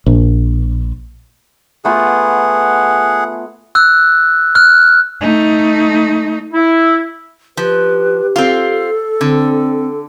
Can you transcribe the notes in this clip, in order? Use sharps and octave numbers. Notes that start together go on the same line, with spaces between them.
A#1
A3 B3 F4 G#4 F#5
E6 F#6
F6 F#6
A3 D#4
E4
F3 G4 B4
C4 F4 A4
D3 C4